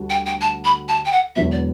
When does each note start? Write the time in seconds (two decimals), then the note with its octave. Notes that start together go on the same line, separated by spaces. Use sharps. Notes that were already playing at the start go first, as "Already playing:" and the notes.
Already playing: D2 G3 D4 F#4
0.09 G5
0.26 G5
0.41 A5
0.64 B5
0.88 A5
1.05 G5
1.11 F#5
1.35 E1 E2 D3 F#3 B3 E5
1.51 D5